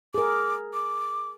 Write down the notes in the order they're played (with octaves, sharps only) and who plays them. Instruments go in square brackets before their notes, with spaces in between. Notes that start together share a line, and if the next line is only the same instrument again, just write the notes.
[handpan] G#4 A#4 [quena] D6
[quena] D6